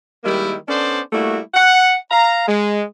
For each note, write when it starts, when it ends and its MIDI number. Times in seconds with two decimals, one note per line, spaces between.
0.24 0.55 51
0.24 0.55 55
0.24 0.55 56
0.24 0.55 58
0.24 0.55 64
0.68 1.00 59
0.68 1.00 61
0.68 1.00 62
0.68 1.00 69
0.68 1.00 72
0.68 1.00 74
1.12 1.39 55
1.12 1.39 57
1.12 1.39 58
1.12 1.39 64
1.12 1.39 66
1.54 1.96 78
2.11 2.47 77
2.11 2.47 82
2.48 2.83 56